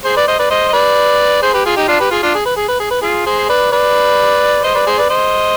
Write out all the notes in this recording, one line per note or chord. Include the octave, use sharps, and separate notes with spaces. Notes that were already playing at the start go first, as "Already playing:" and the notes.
G#4 C5
B4 D5
C5 D#5
B4 D5
C5 D#5
D#5
B4 D5
G#4 C5
G4 B4
F4 G#4
D#4 G4
D4 F4
G4 B4
F4 G#4
D4 F4
G#4
B4
G#4
B4
G#4
B4
F4 G#4
G#4 C5
B4 D5
B4 D5
C5 D#5
B4 D5
G#4 C5
B4 D5
C5 D#5